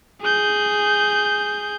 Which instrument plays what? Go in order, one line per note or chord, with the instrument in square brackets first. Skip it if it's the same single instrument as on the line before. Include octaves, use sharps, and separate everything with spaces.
[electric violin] G#4 G6